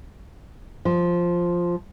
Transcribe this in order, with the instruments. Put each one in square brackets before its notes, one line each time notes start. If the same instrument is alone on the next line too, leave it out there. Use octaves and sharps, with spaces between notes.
[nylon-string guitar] F3